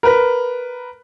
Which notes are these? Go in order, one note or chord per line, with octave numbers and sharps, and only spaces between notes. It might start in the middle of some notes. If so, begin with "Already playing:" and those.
A#4 B4